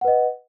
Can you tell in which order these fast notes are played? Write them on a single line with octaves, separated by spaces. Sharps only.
F#5 B4 D#5